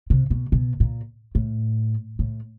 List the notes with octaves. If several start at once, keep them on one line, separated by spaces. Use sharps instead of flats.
C3
B2
B2
A#2
A2
A2